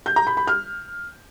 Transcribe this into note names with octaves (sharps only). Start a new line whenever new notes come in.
G6
A#5
B5
B5
F6